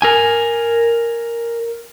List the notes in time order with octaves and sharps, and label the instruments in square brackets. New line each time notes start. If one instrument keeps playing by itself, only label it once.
[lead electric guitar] A#4 G#5